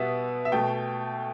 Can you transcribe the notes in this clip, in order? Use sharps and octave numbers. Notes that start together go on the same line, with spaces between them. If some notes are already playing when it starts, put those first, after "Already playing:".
Already playing: B2 G3 B3 E5
E5
B2 A3 G5